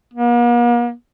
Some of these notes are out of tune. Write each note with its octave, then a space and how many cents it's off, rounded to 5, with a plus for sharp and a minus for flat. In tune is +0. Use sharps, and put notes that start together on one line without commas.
A#3 +45